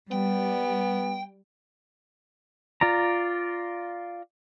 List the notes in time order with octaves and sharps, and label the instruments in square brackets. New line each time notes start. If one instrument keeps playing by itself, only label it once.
[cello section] G3 [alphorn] B3 [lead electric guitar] G5
[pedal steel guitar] F4 D5 A#5